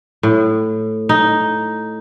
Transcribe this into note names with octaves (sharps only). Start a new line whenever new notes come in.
A2
D#4